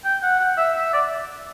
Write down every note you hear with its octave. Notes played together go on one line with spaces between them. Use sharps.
G5
F#5
F#5
E5
E5
D5